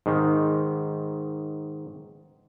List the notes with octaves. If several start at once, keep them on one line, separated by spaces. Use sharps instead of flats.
G#2 D#3